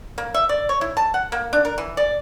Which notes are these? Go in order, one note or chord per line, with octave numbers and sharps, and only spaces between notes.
A#3
E5
D5
C#5
E4
A5
F#5
A#3
D4
A#4
E3
D5